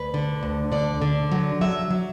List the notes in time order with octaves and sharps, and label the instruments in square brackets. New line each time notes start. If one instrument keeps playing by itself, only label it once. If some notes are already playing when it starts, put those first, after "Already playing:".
Already playing: [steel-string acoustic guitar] D2 B4
D3
D2
D3 D5
D3
F#3
F#3 E5
F#3